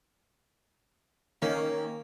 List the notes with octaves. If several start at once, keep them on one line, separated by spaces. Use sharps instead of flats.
D#3 A#3 C#4